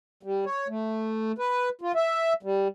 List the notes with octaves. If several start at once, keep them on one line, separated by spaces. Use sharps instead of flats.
G3
C#5
A3
B4
F4
E5
G3